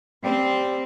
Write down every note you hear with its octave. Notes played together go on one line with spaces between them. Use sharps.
G3 C4